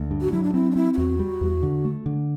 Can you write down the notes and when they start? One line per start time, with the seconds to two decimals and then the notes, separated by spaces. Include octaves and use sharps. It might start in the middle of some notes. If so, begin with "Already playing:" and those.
Already playing: D2
0.11 G2
0.21 F#4
0.32 F#3 E4
0.43 D4
0.54 C4 E4
0.71 D4
0.76 C4 E4
0.94 E4
0.98 E2 F#4
1.19 G3
1.41 E2
1.63 D3
1.85 A3
2.06 D3